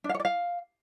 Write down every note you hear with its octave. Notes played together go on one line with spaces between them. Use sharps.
D4
F5
C#5
D5
F5